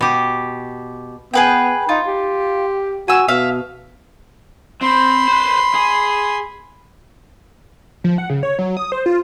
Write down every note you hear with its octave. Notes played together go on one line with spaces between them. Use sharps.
B2 G4
B3 G#4 B4 G5
D#4 F4
G4
F#4 G#5 E6
B2 E5 F5
C4 B5 C6
B4 C5
G#4
F3
F#5
C#3
C#5
F#3
D#6
C5
F4